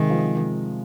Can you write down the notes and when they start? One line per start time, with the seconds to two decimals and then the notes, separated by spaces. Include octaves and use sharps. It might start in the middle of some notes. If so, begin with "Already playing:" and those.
Already playing: C3 D#3 G#3
0.10 F3